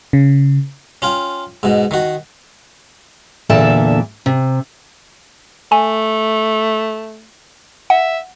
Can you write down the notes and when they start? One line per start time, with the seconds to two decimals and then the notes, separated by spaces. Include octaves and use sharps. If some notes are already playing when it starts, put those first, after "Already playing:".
0.13 C#3
1.02 C#4 F4 G5
1.63 G#2 B2
1.91 D#3 F#4
3.49 E2 A#2 D3 A4 E5 A5
4.26 C3
5.72 A3 G#5
7.90 E5 F#5